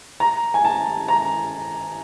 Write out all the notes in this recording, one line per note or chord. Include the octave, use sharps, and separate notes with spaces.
A#5
G#5
A5
A#5